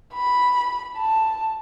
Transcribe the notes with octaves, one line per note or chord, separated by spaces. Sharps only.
B5
A5